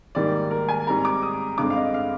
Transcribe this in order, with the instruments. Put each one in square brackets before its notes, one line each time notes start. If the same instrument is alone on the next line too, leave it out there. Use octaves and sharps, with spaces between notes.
[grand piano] G#2 D#3 G3 A#3 D5
A#4
G#5
G#2 G3 C4 A#5
D6
D#6
G2 D3 G#3 C4 D6
F5
D#5
F5